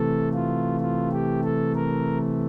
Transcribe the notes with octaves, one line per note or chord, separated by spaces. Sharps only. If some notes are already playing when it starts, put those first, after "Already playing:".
Already playing: C3 E3 A3 A4
F4
F4
G4
A4
A#4